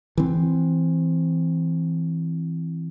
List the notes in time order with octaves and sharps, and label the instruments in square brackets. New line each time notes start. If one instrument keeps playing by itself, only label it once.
[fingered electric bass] E3 C4